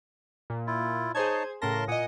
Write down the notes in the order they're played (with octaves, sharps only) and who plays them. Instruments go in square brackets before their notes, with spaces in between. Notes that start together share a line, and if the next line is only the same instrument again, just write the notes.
[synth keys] A#2
[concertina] E4 F4
[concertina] D#4 C#5 A5 [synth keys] G#4 C5 G#6
[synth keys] A2 C#3 A#6 [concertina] A#4 A5 C6
[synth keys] A#2 D#5 [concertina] F#5 G#5 D#6